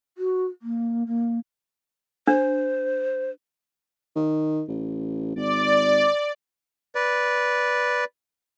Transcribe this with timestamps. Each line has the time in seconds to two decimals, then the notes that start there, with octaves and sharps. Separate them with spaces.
0.18 F#4
0.62 A#3
1.07 A#3
2.27 D4 C5
4.15 D#3
4.68 A1
5.36 G#1 D5
6.95 B4 D5